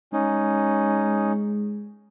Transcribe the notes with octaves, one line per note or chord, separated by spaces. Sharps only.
G#3 C#4 D#4